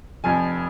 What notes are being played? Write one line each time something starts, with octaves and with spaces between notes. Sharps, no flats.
F1 F2 F3 G#5